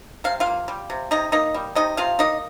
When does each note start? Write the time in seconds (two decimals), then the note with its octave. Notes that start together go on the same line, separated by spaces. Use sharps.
0.24 C3 F5
0.40 F4 F5
0.46 A#3
0.68 G3
0.90 C3
1.11 C3 D#4 D#5
1.32 A#3 D#4 D#5
1.54 G3
1.75 C3 D#4 D#5
1.97 C3 F4 F5
2.19 A#3 D#4 D#5